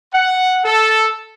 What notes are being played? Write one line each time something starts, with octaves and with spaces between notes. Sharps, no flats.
F#5
A4